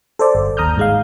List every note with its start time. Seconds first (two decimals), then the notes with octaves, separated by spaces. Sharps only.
0.19 A4 C5 D5
0.35 G1
0.57 D#2 A#5 D#6 F6 G6
0.77 G#2 G#3 F5